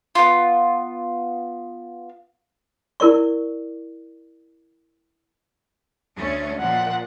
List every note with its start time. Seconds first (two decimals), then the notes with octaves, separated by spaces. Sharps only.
0.15 B3 F4
3.00 E4 A#4 D5 C#6
6.18 D2 A3 C#4
6.61 A#2 F3 F#5